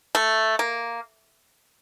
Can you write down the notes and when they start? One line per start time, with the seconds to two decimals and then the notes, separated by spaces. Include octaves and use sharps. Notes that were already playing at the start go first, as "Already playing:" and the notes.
0.15 A3
0.59 A#3